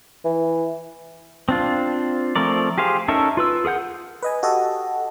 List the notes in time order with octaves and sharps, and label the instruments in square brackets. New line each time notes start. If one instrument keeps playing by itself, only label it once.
[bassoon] E3
[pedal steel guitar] C4 D4 F4
F3 A3 C4 A#4 D5
G4 G#4 C5 F5
C#4 D#4 A4 A#4 E5
F4 B4 E6
G#4 A#4 F#5 G6
[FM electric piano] B4 D#5 G#5
F#4 G4 A4 D#5